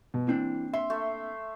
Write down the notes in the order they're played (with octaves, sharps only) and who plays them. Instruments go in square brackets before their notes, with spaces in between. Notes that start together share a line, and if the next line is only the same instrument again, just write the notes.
[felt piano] B2
[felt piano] E3 [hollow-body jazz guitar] A#3 C4 D4
[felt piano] E5 [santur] C6
[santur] A3